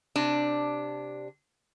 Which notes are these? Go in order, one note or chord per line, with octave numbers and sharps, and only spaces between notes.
C3 D4